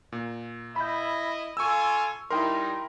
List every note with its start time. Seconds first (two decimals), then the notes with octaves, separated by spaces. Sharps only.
0.12 A#2
0.76 E4 D#5 B5 G6
1.57 F4 A4 G#5 C#6 E6
2.30 G3 D#4 E4 A#4 G5 C6